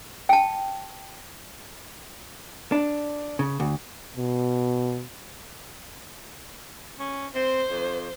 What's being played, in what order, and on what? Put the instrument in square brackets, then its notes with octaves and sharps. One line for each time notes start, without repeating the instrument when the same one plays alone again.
[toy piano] G5 A5
[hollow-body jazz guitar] D4
C#3
D2
[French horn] B2
[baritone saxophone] C#4
[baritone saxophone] C4 [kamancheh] C5
[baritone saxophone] F2